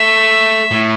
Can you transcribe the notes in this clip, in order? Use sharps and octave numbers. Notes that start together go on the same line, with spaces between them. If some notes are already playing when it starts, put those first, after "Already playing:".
Already playing: A3 E5
A2